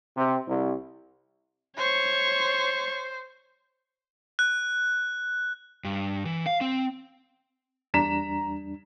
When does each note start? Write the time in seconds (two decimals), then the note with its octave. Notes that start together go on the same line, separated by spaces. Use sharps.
0.17 C3
0.47 C2
1.77 C5 C#5 C#6
4.39 F#6
5.84 G2
6.25 E3
6.46 F5
6.61 C4
7.94 E2 G3 D4 A#5 B6 E7